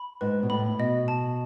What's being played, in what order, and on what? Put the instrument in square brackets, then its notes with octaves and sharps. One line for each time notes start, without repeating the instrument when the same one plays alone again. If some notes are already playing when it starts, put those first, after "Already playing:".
Already playing: [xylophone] B5
[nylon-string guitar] G#2 [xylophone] B4
[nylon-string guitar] B2
[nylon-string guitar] A2 [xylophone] B5
[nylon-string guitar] B2 [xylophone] D#5
[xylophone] A5